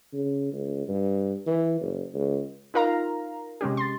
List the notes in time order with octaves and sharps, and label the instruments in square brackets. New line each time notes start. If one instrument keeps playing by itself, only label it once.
[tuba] C#3
C#2
G2
E3
F#1
C#2
[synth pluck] D#4 F4 A#4 F5 A#5
C3 G#3 C#4 G4
C6 A6